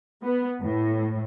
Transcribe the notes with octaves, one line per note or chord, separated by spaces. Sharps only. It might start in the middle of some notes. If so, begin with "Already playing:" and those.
B3
A2